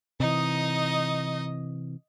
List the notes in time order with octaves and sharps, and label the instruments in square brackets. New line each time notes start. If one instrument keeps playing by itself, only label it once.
[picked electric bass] C3 E3 [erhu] D#4 [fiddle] D#5